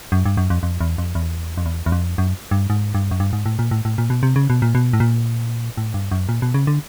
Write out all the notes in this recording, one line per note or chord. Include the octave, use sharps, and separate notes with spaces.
F#2
G2
F#2
F2
F2
E2
F2
E2
F2
E2
E2
F2
F#2
G2
G#2
G2
F#2
G2
G#2
A2
A#2
A2
A2
A#2
B2
C3
C#3
B2
A#2
B2
A2
A#2
A2
G2
F#2
A#2
B2
C#3
D3